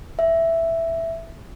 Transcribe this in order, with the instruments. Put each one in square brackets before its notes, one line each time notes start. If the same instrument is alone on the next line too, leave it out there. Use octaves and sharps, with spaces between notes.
[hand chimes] E5